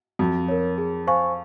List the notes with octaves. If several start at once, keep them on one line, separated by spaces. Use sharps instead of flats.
F2 F#4
A#4 C#5
G#4
C5 F5 G#5 C#6